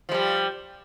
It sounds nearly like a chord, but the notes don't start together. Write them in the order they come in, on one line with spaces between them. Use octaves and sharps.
F3 G#3 G3